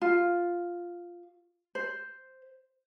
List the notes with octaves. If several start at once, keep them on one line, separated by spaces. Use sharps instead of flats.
F4
C5